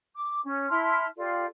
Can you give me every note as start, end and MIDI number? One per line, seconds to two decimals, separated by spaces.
0.15 0.38 86
0.44 0.68 61
0.69 1.06 64
0.69 1.06 81
0.69 1.06 84
0.69 1.06 89
1.17 1.45 65
1.17 1.45 67
1.17 1.45 69
1.17 1.45 74